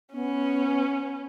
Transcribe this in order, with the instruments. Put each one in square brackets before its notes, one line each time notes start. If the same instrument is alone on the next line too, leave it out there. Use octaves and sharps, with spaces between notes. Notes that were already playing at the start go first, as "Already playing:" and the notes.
[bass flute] B3 [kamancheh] C#4